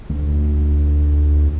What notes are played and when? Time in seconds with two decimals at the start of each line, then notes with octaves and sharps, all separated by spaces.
0.10 D2